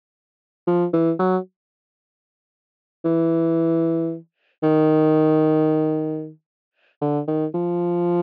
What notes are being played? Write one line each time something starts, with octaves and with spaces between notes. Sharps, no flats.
F3
E3
F#3
E3
D#3
D3
D#3
F3